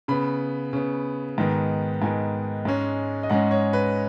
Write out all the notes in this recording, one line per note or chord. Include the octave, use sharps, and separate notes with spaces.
C#3 B3 B5
C#3 B3
G#2 D#3 B3
G#2 D#3 B3 G#5
G#2 G#3 C#4
D#5
G#2 G#3 C#4 F#5
C#5
B4